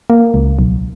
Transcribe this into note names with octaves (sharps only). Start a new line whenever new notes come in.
A#3
C#2
B1